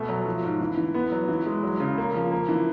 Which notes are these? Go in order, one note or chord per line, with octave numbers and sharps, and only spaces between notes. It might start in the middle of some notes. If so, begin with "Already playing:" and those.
Already playing: B2 A3
F#3
F3
G#2
E3
E3
B3
F#3
E3
G#3
F#3
C#3
A#3
F3
A#3
E3